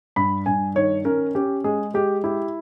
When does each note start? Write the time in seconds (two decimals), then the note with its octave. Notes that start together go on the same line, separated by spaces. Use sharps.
0.16 G2 B5
0.46 G2 G#5
0.75 D#3 C#5
1.05 C#4 A#4
1.35 C#4 G4
1.64 G#3 G#4
1.94 G#3 G4
2.24 E4 G4